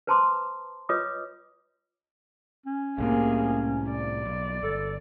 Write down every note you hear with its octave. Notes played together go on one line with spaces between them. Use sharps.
B4 C5 A5 A#5 C6 D6
F4 B4 C#5 D#5 D6 D#6
C#4
C2 A2 C3 A#3 G#4
D5
B1
G1 A4